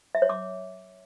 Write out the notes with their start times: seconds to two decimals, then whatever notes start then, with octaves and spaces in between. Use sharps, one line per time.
0.15 E5
0.22 C#5
0.29 D6